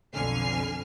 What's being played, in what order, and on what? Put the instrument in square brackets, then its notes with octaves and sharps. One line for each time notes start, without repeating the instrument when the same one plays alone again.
[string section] B1 F2 D3 G#5 F6 C7